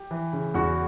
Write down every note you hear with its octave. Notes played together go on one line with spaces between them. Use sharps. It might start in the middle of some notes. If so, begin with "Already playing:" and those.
Already playing: G4
E3
C#3
E2 F#4